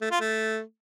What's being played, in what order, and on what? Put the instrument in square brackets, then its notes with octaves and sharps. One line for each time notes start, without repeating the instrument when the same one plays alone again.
[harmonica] A3
F4
A3